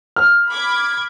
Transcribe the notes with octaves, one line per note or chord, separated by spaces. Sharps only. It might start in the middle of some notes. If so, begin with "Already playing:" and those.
F6
B5 D6 G#6